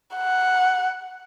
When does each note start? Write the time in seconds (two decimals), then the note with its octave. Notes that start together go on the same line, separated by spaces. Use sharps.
0.16 F#5